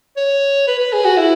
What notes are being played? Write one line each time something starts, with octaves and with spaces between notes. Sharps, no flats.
C#5
B4
B4
G#4
F#4
E4